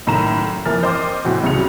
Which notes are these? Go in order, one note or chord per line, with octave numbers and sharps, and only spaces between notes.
F#1 A2 D#3 A#5 E7
F1 E3 F3 A#3 F6 A6
C5 D#5 G5 C6 D6
A2 E3 C4 F#4
F#1 C2 C#3 F#3 C#7 F7